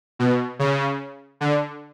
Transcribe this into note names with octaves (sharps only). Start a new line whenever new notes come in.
B2
C#3
D3